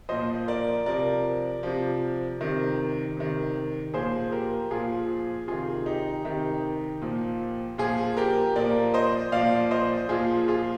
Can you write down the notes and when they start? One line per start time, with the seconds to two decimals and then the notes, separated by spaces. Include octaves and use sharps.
0.09 A#2 F3 C5 D#5
0.48 A#4 D5
0.86 C3 F3 A#4 D5
1.63 C3 F3
2.41 C3 D#3
3.17 C3 D#3
3.94 A#2 F3 G#4 C5
4.32 G4 A#4
4.71 A#2 F3 F4 G#4
5.48 C3 D#3 F4 G#4
5.86 D#4 G4
6.25 C3 D#3 D#4 G4
7.01 A#2 F3
7.78 A#2 F3 F4 G#4
8.17 G4 A#4
8.56 A#2 F3 A#4 D5
8.94 C5 D#5
9.32 A#2 F3 D5 F5
9.71 C5 D#5
10.09 A#2 F3 F4 G#4
10.48 F4 G#4